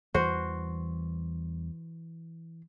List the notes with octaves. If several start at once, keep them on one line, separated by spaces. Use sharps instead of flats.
E2 E3 G3 F#4 C5